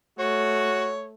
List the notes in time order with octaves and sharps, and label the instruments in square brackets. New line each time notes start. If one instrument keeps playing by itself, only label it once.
[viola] A3 [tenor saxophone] F#4 [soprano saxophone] C#5